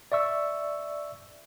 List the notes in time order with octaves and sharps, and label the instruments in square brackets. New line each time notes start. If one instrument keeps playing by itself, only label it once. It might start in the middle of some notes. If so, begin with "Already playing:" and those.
[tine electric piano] D5 E5 C#6 E6